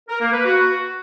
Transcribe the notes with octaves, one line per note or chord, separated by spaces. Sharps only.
A#4
A#3
B4
F#4